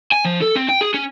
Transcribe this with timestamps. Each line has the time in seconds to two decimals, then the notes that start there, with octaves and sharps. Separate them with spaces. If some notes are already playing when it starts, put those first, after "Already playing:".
0.12 G#5
0.25 F3
0.42 A4
0.56 C4
0.69 G5
0.81 G#4
0.94 C#4